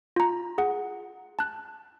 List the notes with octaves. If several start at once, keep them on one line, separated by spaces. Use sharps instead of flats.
F4 A#5
G#4 F#5
A5 F#6